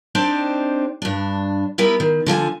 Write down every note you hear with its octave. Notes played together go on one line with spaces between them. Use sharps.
C4 D4 D#4 G4 C5 D5
G2 D4
G3 B3 E4 A#4 B4
D#3
D3 F3 D#5 G#5